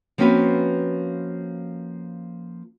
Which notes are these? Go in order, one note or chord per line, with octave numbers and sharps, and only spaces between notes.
F3 A#3 C4 C#4 F#4 B4